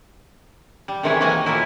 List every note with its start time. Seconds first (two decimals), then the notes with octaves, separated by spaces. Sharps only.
0.88 G3
1.03 C3 D#3 E3 G#3 C#5
1.21 F#3 A#3 G#5 A#5
1.46 A#2 F3 F#3 A#3 E4